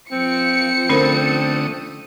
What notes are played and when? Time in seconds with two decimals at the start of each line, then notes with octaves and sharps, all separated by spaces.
0.12 F3 C4 C#7
0.90 D3 A3 C#4 A#4 C5 D#6